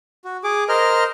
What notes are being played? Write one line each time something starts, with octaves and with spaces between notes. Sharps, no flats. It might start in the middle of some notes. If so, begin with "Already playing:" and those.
F#4
G#4 D6
A#4 C5 D#5 F6